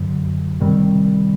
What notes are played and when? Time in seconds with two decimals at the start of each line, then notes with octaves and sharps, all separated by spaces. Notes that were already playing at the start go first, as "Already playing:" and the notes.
Already playing: F#2 D3 F#3
0.60 C3 D#3 G3 C4